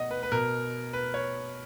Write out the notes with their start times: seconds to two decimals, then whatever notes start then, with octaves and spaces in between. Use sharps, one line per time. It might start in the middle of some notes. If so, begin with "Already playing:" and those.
Already playing: B2 D#5 F#5
0.11 B4
0.23 B4
0.32 B2 A#4
0.93 B4
1.14 C#5